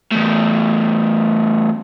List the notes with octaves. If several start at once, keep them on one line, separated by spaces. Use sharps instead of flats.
E2 A2